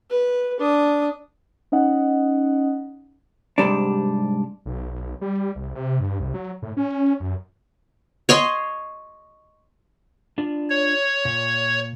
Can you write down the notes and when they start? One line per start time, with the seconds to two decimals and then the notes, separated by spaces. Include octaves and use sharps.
0.10 B4
0.60 D4 D#6
1.72 C#4 D#4 D#5 F#5
3.58 G#2 C3 G3 D4
4.66 B1
4.93 B1
5.21 G3
5.55 C2
5.75 C3
6.00 G2
6.20 C2
6.34 F#3
6.62 A2
6.77 C#4
7.20 F#2
8.29 C#5 D#5 C6
10.38 D4 F4 D5
10.70 C#5
11.25 A#2